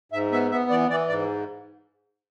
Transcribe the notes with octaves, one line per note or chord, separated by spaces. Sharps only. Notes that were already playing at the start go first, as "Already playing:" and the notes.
G#2 E5
B3 E5
B3 E5
E3 D5
E3 D5
G#2 D5